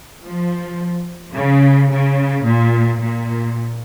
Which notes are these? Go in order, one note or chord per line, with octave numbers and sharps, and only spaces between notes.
F3
C#3
C#3
A#2
A#2